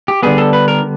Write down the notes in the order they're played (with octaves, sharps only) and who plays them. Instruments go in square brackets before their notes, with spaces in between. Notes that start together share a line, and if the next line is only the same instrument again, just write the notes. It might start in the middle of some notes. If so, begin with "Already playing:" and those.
[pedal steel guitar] G4
D3 G3 B3 G#4
A4
B4
A#4